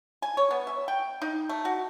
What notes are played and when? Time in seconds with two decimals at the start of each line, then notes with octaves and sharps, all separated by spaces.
0.22 G#5
0.37 C#5
0.51 B3
0.67 E5
0.88 G5
1.22 D#4
1.49 A3
1.65 F#4